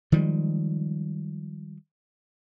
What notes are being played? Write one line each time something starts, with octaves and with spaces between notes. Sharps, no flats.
D#3 F3 G3 G#3